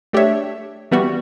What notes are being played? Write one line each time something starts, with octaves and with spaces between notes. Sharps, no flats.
A3 D4 G4 C#5 E5
E3 G3 B3 F#4